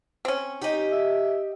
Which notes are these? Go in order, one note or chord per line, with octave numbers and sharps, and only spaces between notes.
C4 C#4
D#4 G4 D#5
E5